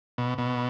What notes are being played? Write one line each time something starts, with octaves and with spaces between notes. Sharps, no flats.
B2
B2